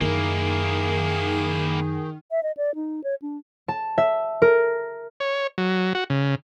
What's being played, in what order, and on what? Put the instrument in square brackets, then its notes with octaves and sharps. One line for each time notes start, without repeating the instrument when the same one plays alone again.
[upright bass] F#2 [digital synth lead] D#3 [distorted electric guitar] A#3 E4 [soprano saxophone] G#4
[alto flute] E5
D#5
D5
D#4
C#5
D4
[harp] A5
E5
A#4
[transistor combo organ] C#5
F#3
F#4
C#3